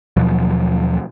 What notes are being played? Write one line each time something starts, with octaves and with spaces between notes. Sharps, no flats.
D#2 B2 F3 F#3